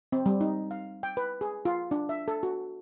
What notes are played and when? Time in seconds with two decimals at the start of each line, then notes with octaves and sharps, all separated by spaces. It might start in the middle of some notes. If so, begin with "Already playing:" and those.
0.12 C4
0.26 G3
0.41 D#4
0.71 F5
1.03 G5
1.17 B4
1.41 G#4
1.65 F4
1.91 D4
2.09 E5
2.28 A4
2.43 F#4